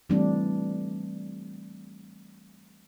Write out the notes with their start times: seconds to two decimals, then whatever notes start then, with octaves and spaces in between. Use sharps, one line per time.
0.09 E3 G3 A3 C4 D4